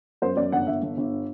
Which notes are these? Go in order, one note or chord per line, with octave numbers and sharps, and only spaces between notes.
F#2 C5
F#2 D5
G1 F#5
G1 E5
G1
G1